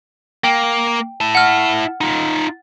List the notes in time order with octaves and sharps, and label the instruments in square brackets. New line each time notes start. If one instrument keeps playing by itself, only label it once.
[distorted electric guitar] A#3 [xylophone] G5
[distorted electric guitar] E4 A5
[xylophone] F#5 F6
[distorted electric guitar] D#4 F4